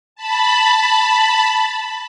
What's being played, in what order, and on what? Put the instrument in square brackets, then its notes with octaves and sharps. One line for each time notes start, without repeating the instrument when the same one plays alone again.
[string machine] A5 B5